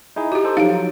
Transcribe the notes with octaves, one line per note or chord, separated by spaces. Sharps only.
D#4 E4 G#4
F#4 G4
D#4 A4 C5
F3 F#3 D#4 F5 D7